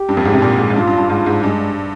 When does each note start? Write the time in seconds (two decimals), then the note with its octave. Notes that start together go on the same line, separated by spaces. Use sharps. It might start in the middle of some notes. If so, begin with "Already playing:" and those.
Already playing: G4
0.09 G2
0.17 F2
0.25 G#2
0.33 C3
0.42 A#2
0.58 G#2
0.70 G#2
0.76 G2 F4
0.87 G2
0.98 G2
1.10 G#2 F4
1.26 G#2
1.43 G2 G#3